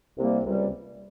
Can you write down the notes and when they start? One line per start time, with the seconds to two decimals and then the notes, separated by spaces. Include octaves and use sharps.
0.18 C2 C3 G3 A#3
0.45 C#2 C3 G3